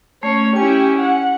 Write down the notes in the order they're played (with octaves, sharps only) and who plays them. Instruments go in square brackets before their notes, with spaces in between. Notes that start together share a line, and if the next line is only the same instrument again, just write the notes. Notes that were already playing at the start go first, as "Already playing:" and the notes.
[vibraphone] A3 [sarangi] C#4 [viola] C#5
[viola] C#4 E4 [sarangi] G4 [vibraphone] G#5
[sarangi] F#5